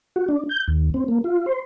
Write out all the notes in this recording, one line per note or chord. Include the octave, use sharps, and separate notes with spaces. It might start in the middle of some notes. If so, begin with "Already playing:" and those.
F#4
D4
G6
D#2
C4
A#3
F4
C5